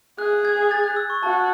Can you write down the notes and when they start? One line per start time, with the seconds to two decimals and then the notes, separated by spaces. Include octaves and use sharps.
0.19 G#4 F#6
0.45 G#6
0.71 A6
0.84 F#6
0.96 E6
1.10 C#6
1.23 F#4 A5